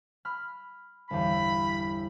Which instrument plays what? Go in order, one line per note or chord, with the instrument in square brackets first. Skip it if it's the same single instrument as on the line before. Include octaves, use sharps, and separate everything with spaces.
[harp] B5 F6
[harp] G1 E2 [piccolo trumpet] B5